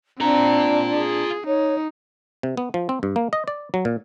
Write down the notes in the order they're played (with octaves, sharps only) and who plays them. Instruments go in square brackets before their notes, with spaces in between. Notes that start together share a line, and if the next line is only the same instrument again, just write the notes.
[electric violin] C4 [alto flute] D4 [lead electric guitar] F4 A#5
[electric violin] G#4
[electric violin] D#4 [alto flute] C#5
[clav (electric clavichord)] C3
B3
F3
C4
G2
A#3
D#5
D5
F#3
A#2